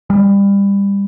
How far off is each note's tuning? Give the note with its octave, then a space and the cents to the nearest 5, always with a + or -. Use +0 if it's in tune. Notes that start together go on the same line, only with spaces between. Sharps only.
G3 +25